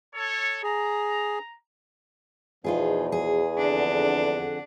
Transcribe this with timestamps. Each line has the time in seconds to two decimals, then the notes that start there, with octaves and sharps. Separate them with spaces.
0.15 A4 C#5
0.63 G#4 A#5
2.64 E2 B2 F3 D#4 F4 G#4
3.12 G#4
3.58 F2 D3 D4 F#5